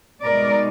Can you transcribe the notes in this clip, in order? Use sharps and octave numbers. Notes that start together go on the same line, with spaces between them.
B2 G#3 D#4 A#4 D5